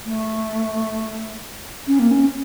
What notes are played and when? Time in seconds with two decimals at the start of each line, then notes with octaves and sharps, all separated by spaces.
0.06 A3
1.87 C#4
1.99 A#3
2.11 C#4